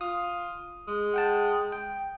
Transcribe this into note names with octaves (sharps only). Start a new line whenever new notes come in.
F4 D#6
G#3
F#5 G5 A5
G5